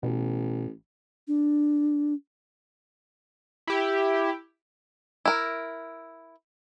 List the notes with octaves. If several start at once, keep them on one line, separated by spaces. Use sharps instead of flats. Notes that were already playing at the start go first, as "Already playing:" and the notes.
A1 B2
D4
E4 G4
E4 A#4